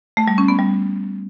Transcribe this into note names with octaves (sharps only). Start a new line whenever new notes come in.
A3
G3
C#4
B3
G3